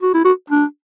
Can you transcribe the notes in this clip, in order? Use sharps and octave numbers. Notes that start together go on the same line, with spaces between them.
F#4
E4
F#4
D4